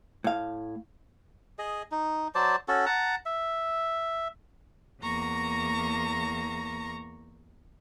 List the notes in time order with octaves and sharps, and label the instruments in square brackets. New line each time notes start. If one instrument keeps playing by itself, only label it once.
[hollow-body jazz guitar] A2 F5
[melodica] G#4 D#5
D#4
F#3 C5 D5 A5
C#4 F#4 A4
F#5 A5 A#5
E5
[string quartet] E2 A#3 A#5 C#6 A#6